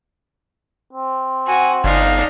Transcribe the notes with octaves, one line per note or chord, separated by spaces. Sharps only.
C4
F#4 G#5
G1 D4 D#4 F5